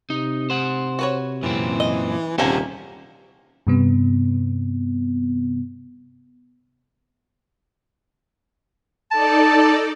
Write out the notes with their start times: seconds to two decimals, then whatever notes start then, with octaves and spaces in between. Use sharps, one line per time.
0.10 C3 D#4
0.50 C5 F#5
0.99 F#4 B4 C#5
1.43 F#2 A#2 E3 C4
1.80 D#5
2.38 D#1 C3 A#3 C#4 F#5 G#5 A5
3.67 G2 C3 B3
9.11 D#4 A4 D5 A5